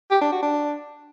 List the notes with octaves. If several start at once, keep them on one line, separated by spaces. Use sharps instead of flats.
G4
D4
F#4
D4